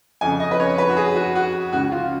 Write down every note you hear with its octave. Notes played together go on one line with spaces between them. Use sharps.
F2 C#3 G#5
D#5
B4
C#5
B4
F#4
G#4
F#4
F#4
C#2 C#3 F#4
F4